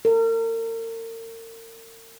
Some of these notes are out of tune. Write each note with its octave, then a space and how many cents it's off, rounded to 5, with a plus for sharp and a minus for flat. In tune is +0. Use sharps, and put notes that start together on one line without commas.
A#4 -40